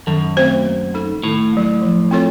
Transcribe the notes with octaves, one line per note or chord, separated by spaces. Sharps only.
F#2 D#3
A3 C4 F#4 C5
A#3
D#4 A4
A2 D#3
F#3 A#3
F3
C4 F4 A4 C#5